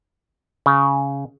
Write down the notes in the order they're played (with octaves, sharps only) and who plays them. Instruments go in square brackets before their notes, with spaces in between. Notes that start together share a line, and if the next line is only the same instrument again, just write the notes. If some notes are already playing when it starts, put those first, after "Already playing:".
[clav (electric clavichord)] C#3